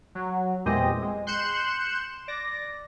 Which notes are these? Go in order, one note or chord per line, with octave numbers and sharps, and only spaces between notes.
F#3
E2 A#2 G#3 C4 G4 D#5
G#3
C6 F#6 G6 C#7 E7
D5 A#6